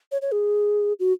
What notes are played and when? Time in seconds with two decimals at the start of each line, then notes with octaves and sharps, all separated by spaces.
0.12 C#5
0.22 C#5
0.32 G#4
1.00 F#4